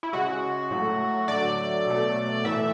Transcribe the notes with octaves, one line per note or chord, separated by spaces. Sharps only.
E4
C#3 G#3 F#4
A2 F#3 A3
D3 F#3 A3 D5
B2 F#3 A3
A2 E3 A3 E5